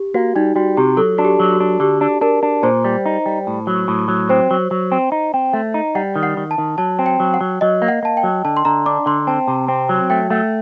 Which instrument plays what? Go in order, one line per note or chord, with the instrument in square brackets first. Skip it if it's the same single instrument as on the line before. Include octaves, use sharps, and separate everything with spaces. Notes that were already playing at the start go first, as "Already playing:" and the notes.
Already playing: [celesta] G4
[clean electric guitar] A#3 [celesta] F#4
[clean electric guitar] G3 [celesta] D#4
[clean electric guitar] G3 [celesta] F#4
[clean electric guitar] C3 [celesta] G4
[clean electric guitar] F#3 [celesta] A4
[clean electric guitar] D4 [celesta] F#4
[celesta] G4
[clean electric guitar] F#3
[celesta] F#4
[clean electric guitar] D4
[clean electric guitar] D3 [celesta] G4
[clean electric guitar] D4
[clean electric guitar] D4 [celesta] A#4
[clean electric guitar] D4
[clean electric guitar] A#2 [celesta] C5
[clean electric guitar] G3
D#4
G3
A2
F#3
A2
F#3
[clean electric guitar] C4 [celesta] C5
[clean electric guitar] F#3
F#3
C4
D#4
C4
A3
D#4
[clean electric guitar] G3 [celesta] F#5
[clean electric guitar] D#3
[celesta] F#5
[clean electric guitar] D#3
[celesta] A5
[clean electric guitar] D#3
[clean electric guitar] F#3 [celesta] A5
[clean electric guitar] C4
[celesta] G5
[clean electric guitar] F#3
[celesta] F#5
[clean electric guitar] F#3
[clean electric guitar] F#3 [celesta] D#5
[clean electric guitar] A#3
[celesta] F#5
[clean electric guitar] A#3 [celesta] A5
[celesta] G5
[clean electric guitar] F#3
[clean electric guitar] D3 [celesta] A5
[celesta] C6
[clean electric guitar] D3 [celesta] A#5
[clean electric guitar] D4 [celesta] D6
[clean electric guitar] D3 [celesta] C6
[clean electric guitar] C4 [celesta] A5
[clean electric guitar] C3
C4
F#3
[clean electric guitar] A3 [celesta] G5
[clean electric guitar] A3 [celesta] F#5